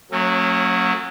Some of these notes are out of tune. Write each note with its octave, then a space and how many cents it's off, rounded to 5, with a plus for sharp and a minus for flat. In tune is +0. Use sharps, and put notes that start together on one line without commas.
F#3 -15 A3 +40 C#4 -40